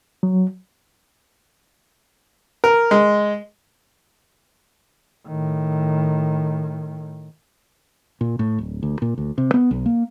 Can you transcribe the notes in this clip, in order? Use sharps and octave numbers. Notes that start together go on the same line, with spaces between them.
F#3
A#4
G#3
A2 D#3
A#2
A2
D1
D2
A#2
D2
C3
B3
B1
A#3